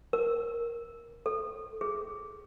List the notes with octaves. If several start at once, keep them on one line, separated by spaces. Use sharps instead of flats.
A#4
A4
G#4